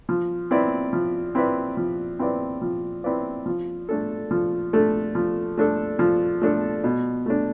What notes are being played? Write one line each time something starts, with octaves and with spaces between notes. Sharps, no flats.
F3
C4 E4 B4 D5
F3
C4 E4 B4 D5
F3
C4 E4 B4 D5
F3
C4 E4 B4 D5
F3
A3 D4 A4
F3
A3 D4 A4
F3
A3 D4 A4
F3
A3 D4 A4
B2
A3 D4